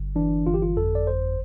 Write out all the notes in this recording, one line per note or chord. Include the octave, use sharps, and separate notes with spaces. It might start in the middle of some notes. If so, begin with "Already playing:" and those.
Already playing: G1
E3 D4
G1 F4
G4
F4
F2 A4
D5
G1 C5